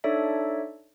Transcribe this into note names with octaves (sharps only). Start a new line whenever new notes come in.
D4 D#4 A4 C#5 D5 E5